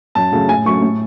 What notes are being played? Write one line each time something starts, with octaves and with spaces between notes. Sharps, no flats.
F#2 A5
C#3 F#3 A3
A2 G#5
F#3 A3 C#4 C#6
A2